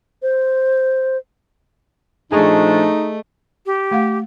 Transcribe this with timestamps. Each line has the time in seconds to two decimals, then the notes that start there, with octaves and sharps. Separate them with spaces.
0.22 C5
2.32 A#2 F3 A3 D4 D#4 G#4 D#5 C#6
3.66 G4
3.91 A3 F5 F#5